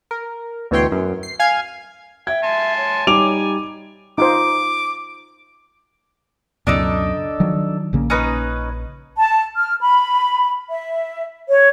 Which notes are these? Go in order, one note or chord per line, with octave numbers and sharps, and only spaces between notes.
A#4
D2 B2 E3 C#5 G5 C6
F#2
C7
F5 G#5 F6 G#6
E5 G5 G#6
G#5 A5 C6
C#5
G3 D#4 G#5 D6 D7 F7
D#4 F4 C5 D6
C#2 F#2 B2 D4 D#4 A4
D#3 F3 F#3
A#1 C#3 A#3
C#4 D#4 B4
A5
F6
B5
E5
C#5